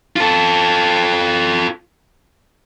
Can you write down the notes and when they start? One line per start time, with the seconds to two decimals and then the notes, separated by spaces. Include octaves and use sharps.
0.16 F4 A4